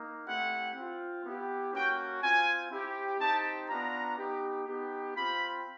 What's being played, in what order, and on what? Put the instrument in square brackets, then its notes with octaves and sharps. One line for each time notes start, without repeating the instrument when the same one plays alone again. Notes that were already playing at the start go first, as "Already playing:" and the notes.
Already playing: [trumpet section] A#3 D#4
A3 C4 E4 G4 F#5
C4 F4
B3 E4 G4
A#3 C#4 F#4 G5
C4 F4 G#5
C4 E4 G4
C4 D#4 G4 A5
B3 D4 F4 A#5
B3 D#4 G4
B3 D#4 G4
C4 F4 B5